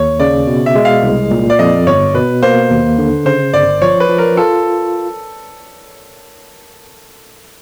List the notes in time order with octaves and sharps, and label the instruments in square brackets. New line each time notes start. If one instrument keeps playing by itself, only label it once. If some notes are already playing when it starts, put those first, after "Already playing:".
Already playing: [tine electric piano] D#2 [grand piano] C#5
[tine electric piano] C#3 [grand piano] D5
[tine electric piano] B2
[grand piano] E5
[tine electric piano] G#3
[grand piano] F5
[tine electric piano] C2
A#2
[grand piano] D5
[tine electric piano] F2 [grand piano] D#5
[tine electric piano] G1 [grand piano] C#5
[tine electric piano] B2 [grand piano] B4
[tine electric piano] A#3 [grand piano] C5
[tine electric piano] D#2
D3
[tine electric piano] C#3 [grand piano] C5
[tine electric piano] G1 [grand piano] D5
[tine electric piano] F3 [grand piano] C#5
[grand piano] B4
[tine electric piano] F3
[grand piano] A#4
[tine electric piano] F4 [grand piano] A4